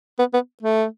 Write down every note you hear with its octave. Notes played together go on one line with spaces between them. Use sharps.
B3
B3
A3